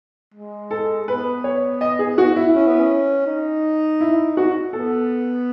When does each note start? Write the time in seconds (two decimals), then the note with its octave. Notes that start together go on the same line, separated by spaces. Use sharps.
0.34 G#3
0.71 A4
1.08 B3 B4
1.44 C#5
1.81 D#5
1.99 G#4
2.18 F#4
2.36 E4
2.55 C#4
2.67 B3
2.79 C#4
3.27 D#4
4.01 E4
4.37 F#4
4.73 B3 A4